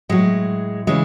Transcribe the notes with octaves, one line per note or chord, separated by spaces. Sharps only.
A2 F#3 G#3
C#3 E3 G#3